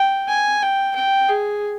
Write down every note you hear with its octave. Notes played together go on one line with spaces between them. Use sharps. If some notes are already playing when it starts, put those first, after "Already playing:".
Already playing: G5
G#5
G5
G5
G#4